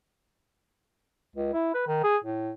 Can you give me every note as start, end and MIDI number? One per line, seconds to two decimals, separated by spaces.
1.36 1.50 37
1.53 1.73 64
1.74 1.85 71
1.87 2.00 51
2.03 2.17 68
2.24 2.52 45